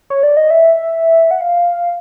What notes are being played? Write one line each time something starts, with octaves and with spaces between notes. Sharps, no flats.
C#5
D5
D#5
E5
F#5
F5